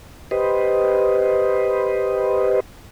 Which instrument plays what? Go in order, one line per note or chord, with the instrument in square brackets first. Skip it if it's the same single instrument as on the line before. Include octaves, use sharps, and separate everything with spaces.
[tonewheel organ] G4 B4 C5 D#5